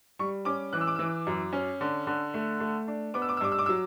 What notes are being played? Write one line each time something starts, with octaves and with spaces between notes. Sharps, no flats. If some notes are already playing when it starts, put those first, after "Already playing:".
G3 C#6
C#4 D6
E3 F#6
E6
D6
E3 E6
F#2
C#4
D3
D3
A3
A3
D4
B3 D6
E6
D6
E6
G2 D6
E6
D6
E6
F#3